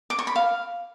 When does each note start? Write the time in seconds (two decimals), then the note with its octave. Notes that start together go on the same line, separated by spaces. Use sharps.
0.10 D6
0.19 C#6
0.27 B5
0.36 F5